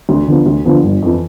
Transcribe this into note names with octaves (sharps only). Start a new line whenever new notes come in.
D2
D3 F3 B3
D2
D3 F3 B3
G1
F2 E3